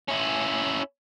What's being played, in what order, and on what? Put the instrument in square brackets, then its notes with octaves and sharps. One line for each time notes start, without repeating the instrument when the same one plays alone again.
[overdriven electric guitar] C#4 E4